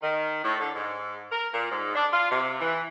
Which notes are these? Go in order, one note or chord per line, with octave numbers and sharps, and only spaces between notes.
D#3
A2
D3
G#2
A#4
A#2
G#2
D4
F4
C3
E3